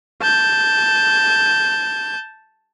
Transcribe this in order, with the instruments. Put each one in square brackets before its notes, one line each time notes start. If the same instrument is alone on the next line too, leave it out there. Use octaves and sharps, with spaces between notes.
[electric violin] A5 G6